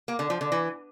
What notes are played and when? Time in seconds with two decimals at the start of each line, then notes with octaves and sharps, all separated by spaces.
0.08 A#3
0.19 D3
0.30 F3
0.41 D3
0.52 E3